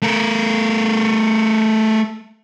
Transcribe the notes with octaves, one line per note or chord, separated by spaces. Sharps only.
A3 A#4